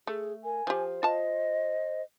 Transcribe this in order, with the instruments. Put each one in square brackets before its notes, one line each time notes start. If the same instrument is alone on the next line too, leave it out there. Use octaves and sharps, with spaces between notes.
[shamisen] A3 [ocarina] G#4
[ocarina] A#4 [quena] G#5
[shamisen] F3 G4 [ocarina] C5
[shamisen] F4 A5 [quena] D#5